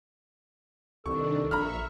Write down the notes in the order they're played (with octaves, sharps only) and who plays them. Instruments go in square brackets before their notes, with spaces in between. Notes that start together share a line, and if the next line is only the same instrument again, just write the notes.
[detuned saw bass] C2 [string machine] D#3 D4 [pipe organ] A4 [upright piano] C#6
[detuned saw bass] A#1 [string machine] E5 C#6 [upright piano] A#5 B5 F6